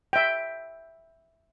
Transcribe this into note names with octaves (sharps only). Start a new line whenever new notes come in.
E5 G5